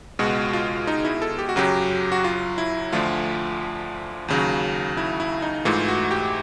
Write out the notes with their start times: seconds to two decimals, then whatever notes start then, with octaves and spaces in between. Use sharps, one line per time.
0.19 C#2 B2 G#3 F#4
0.53 F4
0.87 D#4
1.05 E4
1.22 A4
1.39 G4
1.49 F#4
1.56 F#2 C#3 F#3 G4
2.12 F#4
2.24 F4
2.58 E4
2.92 D2 D3 F3 A3 F4
4.28 D#2 C#3 F#3
4.97 E4
5.20 E4
5.42 D#4
5.65 G#2 E3 A3 F4
5.88 F#4
6.11 G4